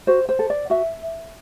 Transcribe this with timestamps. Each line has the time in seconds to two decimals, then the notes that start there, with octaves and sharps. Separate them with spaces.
0.07 F#4 C5
0.29 C5
0.39 A4
0.50 D5
0.70 F#4 E5